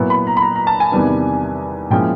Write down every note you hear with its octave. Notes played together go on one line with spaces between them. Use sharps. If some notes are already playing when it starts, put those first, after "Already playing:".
Already playing: A#2 F#3 B3 E4
B5
A#5
B5
A#5
A#5
A5
G#5
E2 C3 D#3 G3 B3
A#2 F3 G#3 C#4 E4 G5